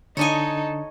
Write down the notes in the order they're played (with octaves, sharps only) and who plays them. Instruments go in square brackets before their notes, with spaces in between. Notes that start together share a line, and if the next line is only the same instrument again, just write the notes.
[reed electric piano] D3 D4 [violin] D#4 A4 [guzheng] C#5 D#5 G#5